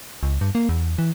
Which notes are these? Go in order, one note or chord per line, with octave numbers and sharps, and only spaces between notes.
C#2
G2
A#3
E2
E3